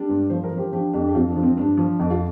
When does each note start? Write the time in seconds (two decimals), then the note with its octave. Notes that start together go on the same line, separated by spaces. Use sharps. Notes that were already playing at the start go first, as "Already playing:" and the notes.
Already playing: G3 D4
0.09 G2
0.30 F3 C5
0.44 A#4
0.51 F3
0.57 G4 C5
0.72 F3 D4 G4
0.93 F2 D4 G4
1.08 G4
1.14 F3 C4 F4
1.28 D4
1.36 F3
1.43 C4
1.56 G2 D4
1.77 F3
1.99 F2
2.10 F4